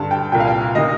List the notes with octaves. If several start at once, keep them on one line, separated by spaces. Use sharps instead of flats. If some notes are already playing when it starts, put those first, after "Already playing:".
Already playing: G2 D3 A5
G5
C2 A#2 G5
F5
G5
C3 D#3 D#5